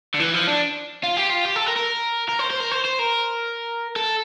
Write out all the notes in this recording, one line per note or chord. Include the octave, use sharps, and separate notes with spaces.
D3
E3
F3
D4
F4
G4
F4
G4
A4
A#4
A#4
A#4
C5
C5
A#4
C5
C5
A#4
A4